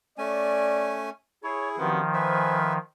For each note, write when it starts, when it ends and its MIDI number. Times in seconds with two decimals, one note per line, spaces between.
0.18 1.10 57
0.18 1.10 61
0.18 0.99 74
0.18 1.10 80
1.44 1.90 64
1.44 1.76 68
1.44 1.69 73
1.78 2.00 42
1.78 2.00 48
1.78 2.78 51
1.78 2.78 53
1.78 2.00 59
2.14 2.73 71
2.14 2.61 72
2.14 2.73 76
2.14 2.61 80